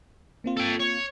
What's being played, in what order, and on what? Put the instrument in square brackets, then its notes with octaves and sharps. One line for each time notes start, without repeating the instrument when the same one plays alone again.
[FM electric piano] A#3 C4 F4
[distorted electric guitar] A4 G5
C#5